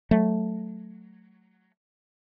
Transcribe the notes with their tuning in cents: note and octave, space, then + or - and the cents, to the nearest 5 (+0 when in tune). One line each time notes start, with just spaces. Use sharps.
F#3 +0 A3 +0